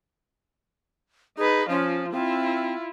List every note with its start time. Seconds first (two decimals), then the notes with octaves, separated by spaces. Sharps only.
1.38 D#4 G#4 B4
1.69 F3 C#4 F4
2.12 C4 E4 F4